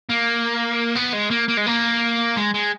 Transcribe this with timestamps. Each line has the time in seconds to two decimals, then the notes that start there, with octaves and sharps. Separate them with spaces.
0.10 A#3
0.96 B3
1.14 G#3
1.31 A#3
1.49 A#3
1.58 G#3
1.67 A#3
2.37 G#3
2.54 G#3